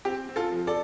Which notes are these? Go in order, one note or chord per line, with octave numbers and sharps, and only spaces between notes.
C4 G4
C4
F4 A4
F3
A4 D5